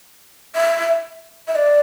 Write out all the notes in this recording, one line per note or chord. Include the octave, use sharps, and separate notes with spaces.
E5
E5
D5